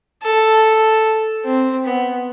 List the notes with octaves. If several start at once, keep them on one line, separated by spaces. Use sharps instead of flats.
A4
C4
B3